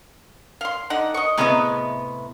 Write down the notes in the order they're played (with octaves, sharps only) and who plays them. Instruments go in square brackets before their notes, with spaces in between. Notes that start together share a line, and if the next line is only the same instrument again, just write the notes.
[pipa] F5 C6
D3 D#4 F#5
D#5 C#6
[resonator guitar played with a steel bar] A2 C3 B3 [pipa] G#4 B4 D#5